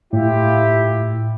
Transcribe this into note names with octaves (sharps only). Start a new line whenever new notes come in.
A2 E4 F4 G4